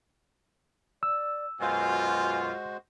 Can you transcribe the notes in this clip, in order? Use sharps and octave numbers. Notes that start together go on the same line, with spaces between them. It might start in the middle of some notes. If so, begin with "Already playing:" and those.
D5 E6
F#2 B2 G#3 F4 F#4 C5 G#5